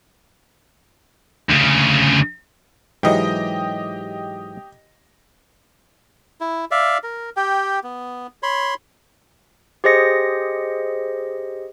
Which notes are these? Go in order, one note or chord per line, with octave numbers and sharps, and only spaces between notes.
D2 C#3
G#2 E3 F#3 G4 D#5
E4
D5 E5 F5
A#4
G4 G5
B3
C#5 B5 C6
G4 G#4 C5 D#5 A#6 C#7